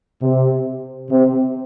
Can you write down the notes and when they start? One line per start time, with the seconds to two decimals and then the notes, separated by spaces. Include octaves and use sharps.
0.22 C3
1.11 C3